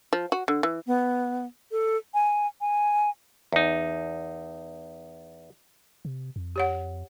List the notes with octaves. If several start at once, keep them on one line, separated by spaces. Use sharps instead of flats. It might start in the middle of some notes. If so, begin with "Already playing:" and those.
F3
F#4
D3
E3
B3
A4
G#5
G#5
E2 D#4
C3
F2
G4 C#5 F#5